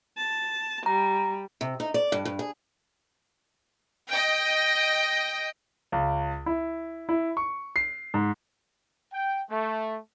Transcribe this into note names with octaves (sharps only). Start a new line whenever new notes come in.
A5
G3 A#5
C3
D#4
D5
G2
G2
G#4
D#5 G5
C#2
E4
E4
C#6
C7
G#2
G5
A3